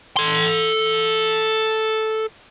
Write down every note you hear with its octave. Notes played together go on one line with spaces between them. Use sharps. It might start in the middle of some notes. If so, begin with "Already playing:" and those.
A4 C6